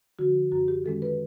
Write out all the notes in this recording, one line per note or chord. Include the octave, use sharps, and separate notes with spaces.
D3 F3 F#4
F#2 F#4
G4
D#3 G#3 C#4 A4
B4